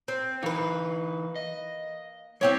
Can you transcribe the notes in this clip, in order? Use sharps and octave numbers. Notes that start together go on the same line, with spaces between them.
C4
E3 A#3 D#4 B4
D#5
G3 C4 E4 G4 C#5